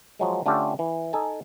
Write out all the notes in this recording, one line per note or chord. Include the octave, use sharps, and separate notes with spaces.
F3 F#3 G#3
D3 A3 C#4 F4 G4 A4
E3
D#4 A4 G#5 A5